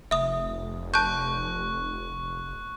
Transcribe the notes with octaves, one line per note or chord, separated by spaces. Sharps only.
F1 E5 D#6
A5 C#6 F#6 G6